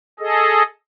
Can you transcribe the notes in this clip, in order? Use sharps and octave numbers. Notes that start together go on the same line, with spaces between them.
G#4 A4 D#5